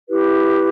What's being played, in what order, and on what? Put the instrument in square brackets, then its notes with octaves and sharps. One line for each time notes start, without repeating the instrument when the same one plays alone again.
[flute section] E4 G4 B4